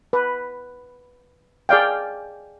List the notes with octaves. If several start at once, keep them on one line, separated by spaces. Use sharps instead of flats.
B4
G#4 D5 F5 G5